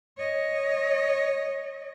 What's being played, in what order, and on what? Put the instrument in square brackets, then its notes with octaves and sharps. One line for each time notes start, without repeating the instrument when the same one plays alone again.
[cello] C#5 D#5